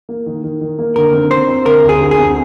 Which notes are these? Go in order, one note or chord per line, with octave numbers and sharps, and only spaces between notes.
A#3
D#3
D#3
D#3
A#3
D3 A#4
C4
C4 C5
C4
D3 A#4
D2
G#4
D2
G#4
C4